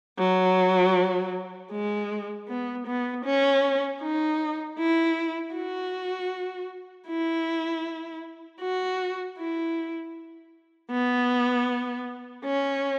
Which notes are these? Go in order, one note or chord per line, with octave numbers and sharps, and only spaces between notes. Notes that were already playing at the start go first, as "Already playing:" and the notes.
F#3
G#3
B3
B3
C#4
D#4
E4
F#4
E4
F#4
E4
B3
C#4